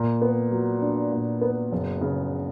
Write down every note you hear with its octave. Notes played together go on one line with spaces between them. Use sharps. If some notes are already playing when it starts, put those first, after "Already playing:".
Already playing: A#2
B3
F#3
D4
A#2
B3
F#1
C#3